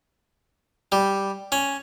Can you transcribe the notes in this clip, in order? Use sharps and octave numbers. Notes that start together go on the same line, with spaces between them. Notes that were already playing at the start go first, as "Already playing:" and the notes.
G3
C#4